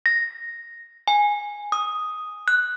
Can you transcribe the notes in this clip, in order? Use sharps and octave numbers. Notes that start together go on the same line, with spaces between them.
A#6
G#5
D#6
F#6